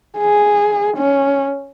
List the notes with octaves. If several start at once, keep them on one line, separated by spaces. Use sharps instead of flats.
G#4
C#4